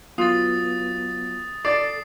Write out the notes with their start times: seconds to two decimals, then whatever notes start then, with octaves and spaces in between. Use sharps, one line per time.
0.18 F#3 B3 F4 D#6 A6
1.65 A4 D5 C7